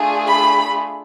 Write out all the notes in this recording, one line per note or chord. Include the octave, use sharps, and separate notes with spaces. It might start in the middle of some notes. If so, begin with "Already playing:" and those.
Already playing: A3 D4 F4 G#4
B5